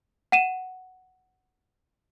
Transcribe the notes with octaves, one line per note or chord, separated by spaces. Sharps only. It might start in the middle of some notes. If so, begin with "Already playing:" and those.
F#5 D#7 E7